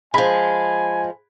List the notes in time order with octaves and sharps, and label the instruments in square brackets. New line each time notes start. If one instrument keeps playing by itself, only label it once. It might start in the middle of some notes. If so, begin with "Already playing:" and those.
[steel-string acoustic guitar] F3 G#3 [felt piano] G#4 B5 B6 [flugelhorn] G#5